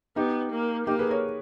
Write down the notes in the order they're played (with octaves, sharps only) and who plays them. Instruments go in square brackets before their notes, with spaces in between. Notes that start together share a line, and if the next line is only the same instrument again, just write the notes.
[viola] B3 [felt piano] D#4 G4
[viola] A#3
[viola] A#3 [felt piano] D#4 G4
[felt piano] G#4 B4
A#4 C#5